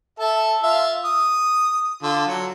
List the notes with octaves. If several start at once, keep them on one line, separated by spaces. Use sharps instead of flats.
A4 E5 A5
F4 E5 F5
D#6
D3 F4
F#3